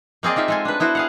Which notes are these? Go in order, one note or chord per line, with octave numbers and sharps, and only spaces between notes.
A#3 C4 G#4 D5 D#5
A#3 D#4 F4 E5
G#3 A4 G#5
D4 B4
B3 E4 F#4 C5
G#4 F5 F#5